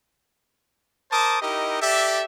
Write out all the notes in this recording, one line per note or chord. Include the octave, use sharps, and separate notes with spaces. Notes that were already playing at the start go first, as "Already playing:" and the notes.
A#4 C5 A5 D6 D#6
D#4 E4 G4 A#4 D#5
G4 A4 D5 E5